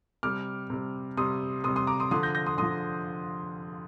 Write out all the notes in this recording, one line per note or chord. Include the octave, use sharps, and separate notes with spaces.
C3 G3 D6 F6
C3 G3
C3 G3 C6 D#6
C3 G3 C6 D#6
C6 D#6
A#5 D6
C6 D#6
D3 F3 C6 D#6
G6 A#6
G6 A#6
C6 D#6
D3 F3 C6 D#6